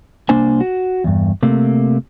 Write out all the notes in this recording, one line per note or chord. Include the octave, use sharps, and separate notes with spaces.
C2 A#3 D4 C5 G#5
F#4
E2 G2
C3 A3 A#3